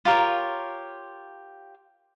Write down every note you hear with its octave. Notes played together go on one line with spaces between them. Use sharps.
F4 G4 A#4 C#5